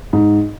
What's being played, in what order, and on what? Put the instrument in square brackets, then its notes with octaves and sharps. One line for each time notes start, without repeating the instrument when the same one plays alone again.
[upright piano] G#2